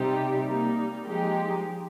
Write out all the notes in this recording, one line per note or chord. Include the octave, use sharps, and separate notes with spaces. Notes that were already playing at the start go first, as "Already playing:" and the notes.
Already playing: C3 G3 C4 D#4 G4
G3 A#3 D#4
F3 G#3 D#4 G4